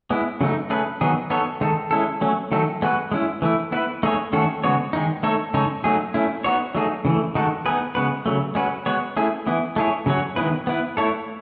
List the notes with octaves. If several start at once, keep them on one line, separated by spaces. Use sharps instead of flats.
G#3 B3 E4
C#3 F#3 A3 D#4
A3 C#4 G#4 B4
D#3 F#3 B3 D#4 G#4
B3 D#4 A4 C#5
D#3 G#3 D#4 A4
G#3 C#4 E4 A4
F#3 A3 C#4
D#3 F#3 A3 D#4 A4
G#3 B3 F#4 B4
G#3 C#4 E4
E3 A3 E4
B3 E4 B4
A3 D#4 G#4 C#5
D#3 A3 C#4 F#4 A4
C#3 G#3 B3 F#4 C#5
D#3 G#3 D#4
A3 D#4 A4 C#5
C#3 G#3 D#4 A4 C#5
F#3 A3 D#4 G#4
A3 C#4 E4
B3 D#4 F#4 C#5
F#3 A3 D#4 G#4
C#3 E3 A3
D#3 G#3 D#4 F#4 A4
B3 D#4 G#4 B4
C#3 G#3 B3 F#4 B4
C#3 F#3 A3
G#3 C#4 F#4 B4
G#3 B3 F#4 C#5
A3 C#4 E4 G#4
E3 B3 E4
A3 E4 G#4 C#5
C#3 F#3 C#4 F#4 C#5
D#3 G#3 B3 E4 B4
B3 E4 B4
A3 E4 A4 C#5